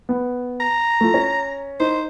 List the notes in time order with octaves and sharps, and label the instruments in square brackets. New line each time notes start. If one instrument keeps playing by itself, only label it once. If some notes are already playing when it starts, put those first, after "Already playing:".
[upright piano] B3
[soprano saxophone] A#5
[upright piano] A3 F4
C#4
[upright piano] D#4 [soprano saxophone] C5